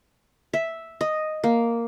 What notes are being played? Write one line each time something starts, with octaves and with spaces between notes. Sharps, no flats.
E5
D#5
A#3